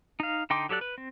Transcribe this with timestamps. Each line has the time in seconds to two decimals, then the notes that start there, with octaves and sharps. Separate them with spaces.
0.20 D#4 F5
0.50 D3 D#4 G5 C6 D6
0.69 F#3 G4 A4 D5 F#6
0.81 B4
0.98 C4